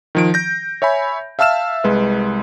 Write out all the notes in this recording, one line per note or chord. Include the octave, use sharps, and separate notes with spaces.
D#3 F3 D7
G6 A#6
C#5 E5 G#5 B5
E5 F5 A5 E6 F6 E7
C2 G#3 B4